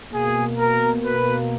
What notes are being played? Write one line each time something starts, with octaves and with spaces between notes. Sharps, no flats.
B2 A#3 G#4
A#4
B4